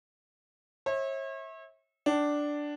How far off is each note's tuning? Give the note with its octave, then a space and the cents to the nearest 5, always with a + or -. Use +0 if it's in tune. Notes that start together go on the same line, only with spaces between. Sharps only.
C#5 -40 E5 -25
D4 +0 G5 -45